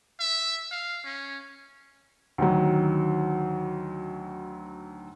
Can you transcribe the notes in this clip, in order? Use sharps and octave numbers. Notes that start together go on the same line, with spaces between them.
E5
F5
C#4
D2 D#3 F#3